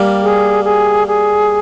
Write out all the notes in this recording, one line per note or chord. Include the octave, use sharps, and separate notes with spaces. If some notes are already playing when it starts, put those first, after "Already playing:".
Already playing: G3 A#3
G#4
G#4
G#4